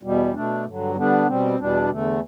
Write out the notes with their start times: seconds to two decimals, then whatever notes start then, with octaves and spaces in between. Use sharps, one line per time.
0.03 E2 B2 G3
0.33 B2 A3 D4
0.65 G2 D3 F#3
0.95 D3 G3 B3 D4
1.27 B2 G3 C4
1.59 E2 B2 G3 D4
1.90 E2 D3 A3